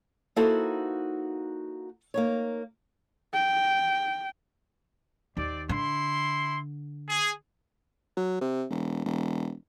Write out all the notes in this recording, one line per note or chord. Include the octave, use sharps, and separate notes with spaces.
A#3 D#4 E4 F#4 A4 C5
A#3 D#4 C#5
G5
D#2 C4 D5
D3 E4 C6
G#4
F#3
C3
E1
E1